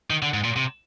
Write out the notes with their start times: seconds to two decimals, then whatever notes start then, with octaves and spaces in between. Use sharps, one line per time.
0.10 D#3
0.22 D3
0.34 G#2
0.44 A#2
0.56 C3